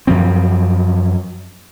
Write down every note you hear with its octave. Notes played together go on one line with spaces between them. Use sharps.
F#2 F3 C4